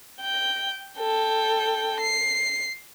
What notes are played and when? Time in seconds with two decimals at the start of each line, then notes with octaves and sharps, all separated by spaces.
0.21 G5
0.99 A4 G5
2.00 C7